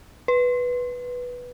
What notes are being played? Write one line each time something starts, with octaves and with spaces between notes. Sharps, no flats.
B4